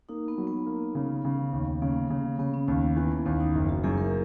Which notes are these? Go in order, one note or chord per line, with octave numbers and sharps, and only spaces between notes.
A#3 D#4
B3
F#3
B3
A#3
C#3
C#3
D#2
C#3 A#3
C#3
C#3 B3
C#4
D#2 C#4
E3 B3
A#3
D#2 B3
D#4
F#1 E4
F#4
F#2 G#4
A#4